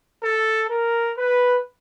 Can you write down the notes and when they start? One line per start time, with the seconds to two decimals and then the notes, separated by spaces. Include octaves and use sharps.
0.24 A4
0.70 A#4
1.16 B4